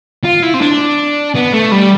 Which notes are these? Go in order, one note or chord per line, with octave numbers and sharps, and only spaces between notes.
F4
E4
C4
D4
B3
A3
G3